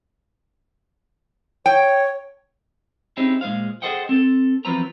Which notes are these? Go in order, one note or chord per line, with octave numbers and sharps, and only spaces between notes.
C#5 G5
C4 C#4 D#4 E4 G4 G#4
A#2 G#3 G#4 C5 F5
G#4 A4 C5 D#5 F#5 G5
C4 A4
E2 F3 F#3 C4 B4 A#5